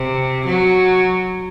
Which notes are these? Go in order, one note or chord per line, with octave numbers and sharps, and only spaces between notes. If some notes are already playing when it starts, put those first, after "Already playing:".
Already playing: C3
F#3